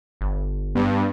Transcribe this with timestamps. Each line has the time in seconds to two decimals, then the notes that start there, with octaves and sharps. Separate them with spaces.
0.21 G1
0.75 G2 B3